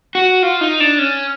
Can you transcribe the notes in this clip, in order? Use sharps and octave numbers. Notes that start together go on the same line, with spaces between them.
F#4
F4
D#4
D4
C#4